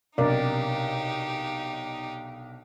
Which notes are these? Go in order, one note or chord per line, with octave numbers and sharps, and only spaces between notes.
B1 C3 D4 D#4 G4 A#4 D5